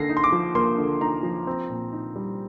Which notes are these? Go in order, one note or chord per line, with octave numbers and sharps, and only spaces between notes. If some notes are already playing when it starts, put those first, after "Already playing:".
Already playing: D3 A#3 A#6 C7
D#4
C6
D6
F3
A#3 C6
D3
D#4 A#5
F3
C4
A#2
D#4
G3